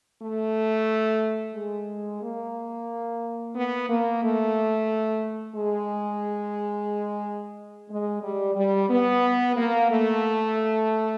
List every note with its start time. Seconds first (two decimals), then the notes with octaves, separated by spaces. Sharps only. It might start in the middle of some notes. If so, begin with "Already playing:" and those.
0.22 A3
1.55 G#3
2.21 A#3
3.55 B3
3.89 A#3
4.22 A3
5.55 G#3
7.90 G#3
8.23 G3
8.56 G3
8.89 B3
9.56 A#3
9.90 A3